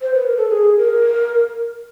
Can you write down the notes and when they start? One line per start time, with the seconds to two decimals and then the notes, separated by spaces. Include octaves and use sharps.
0.02 C5
0.14 B4
0.26 A#4
0.37 A4
0.50 G#4
0.78 A#4